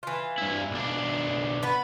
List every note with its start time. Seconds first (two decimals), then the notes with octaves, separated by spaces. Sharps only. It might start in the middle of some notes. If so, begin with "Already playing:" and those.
0.03 E3 F4
0.38 G2 E4
0.71 B1 D4
1.63 B3 B4